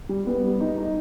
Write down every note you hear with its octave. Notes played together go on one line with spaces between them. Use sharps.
G3
B3
G3
D#4
D#4